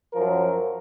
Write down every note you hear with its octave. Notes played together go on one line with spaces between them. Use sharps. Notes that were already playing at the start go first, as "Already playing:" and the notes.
F#2 F3 A#4